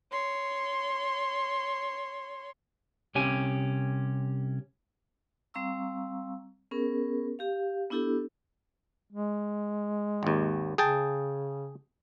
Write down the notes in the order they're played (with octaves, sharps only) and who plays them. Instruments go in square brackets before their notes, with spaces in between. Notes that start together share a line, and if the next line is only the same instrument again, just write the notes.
[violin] C#5 C6
[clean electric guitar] C2 C3 C#4 G4 G#5
[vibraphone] G3 C4 F5 A#5 C#6 E6
B3 C#4 G#4 A#4
G4 F5
B3 D4 E4 G4 A4
[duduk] G#3
[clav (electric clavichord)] G#1 D#2
[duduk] C#3 [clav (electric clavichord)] G#4 G5 A5